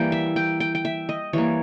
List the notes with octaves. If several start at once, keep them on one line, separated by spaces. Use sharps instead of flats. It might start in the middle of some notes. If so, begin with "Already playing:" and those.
Already playing: E3 G3 A#3 G5
E5
G5
G5
G5
E5
D#5
E3 G3 A#3 C#5